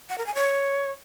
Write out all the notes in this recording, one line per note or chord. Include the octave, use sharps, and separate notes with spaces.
F#5
A#4
G#5
C#5